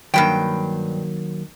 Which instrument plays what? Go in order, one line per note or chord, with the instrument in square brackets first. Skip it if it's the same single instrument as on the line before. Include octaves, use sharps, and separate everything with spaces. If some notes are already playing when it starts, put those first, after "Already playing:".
[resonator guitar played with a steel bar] G2 E3 G5 [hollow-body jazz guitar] D#3 F#3 A#3